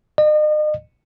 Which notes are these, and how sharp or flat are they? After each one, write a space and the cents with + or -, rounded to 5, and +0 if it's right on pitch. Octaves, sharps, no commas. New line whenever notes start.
D#5 -40